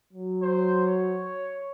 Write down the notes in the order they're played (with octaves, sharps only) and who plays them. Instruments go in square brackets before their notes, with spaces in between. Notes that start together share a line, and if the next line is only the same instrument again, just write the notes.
[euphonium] F#3
[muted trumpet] C5
C#5